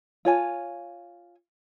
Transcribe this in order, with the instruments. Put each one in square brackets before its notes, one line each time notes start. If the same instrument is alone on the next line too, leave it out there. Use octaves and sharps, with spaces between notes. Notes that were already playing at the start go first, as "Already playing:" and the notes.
[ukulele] F4 C#5 G#5